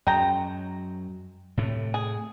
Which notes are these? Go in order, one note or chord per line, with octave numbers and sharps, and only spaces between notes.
F#2 F#3 G#3 G5 A#5
A2 C3 A3
G#4